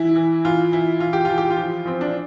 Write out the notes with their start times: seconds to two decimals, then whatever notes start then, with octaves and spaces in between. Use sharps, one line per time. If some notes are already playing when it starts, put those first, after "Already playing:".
Already playing: E3 E4
0.16 E3
0.45 E3 F4
0.72 E3 E4
1.00 E3 F4
1.13 G4
1.25 E3 F4
1.38 G4
1.50 F4
1.57 F3
1.85 F3 C4
2.01 D4